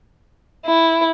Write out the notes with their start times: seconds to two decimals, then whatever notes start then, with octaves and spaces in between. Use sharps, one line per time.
0.66 E4